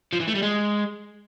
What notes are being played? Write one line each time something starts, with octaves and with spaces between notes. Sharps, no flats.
F3
E3
A3
G3
G#3